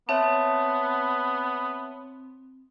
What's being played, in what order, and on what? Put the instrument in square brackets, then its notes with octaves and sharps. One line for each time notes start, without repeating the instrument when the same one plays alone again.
[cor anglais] B3 [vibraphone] C4 [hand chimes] C#5 E5 A5